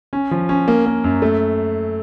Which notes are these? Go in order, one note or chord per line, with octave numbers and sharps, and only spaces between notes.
C#4
F3
C#4
A#3
A#3
F#2
A3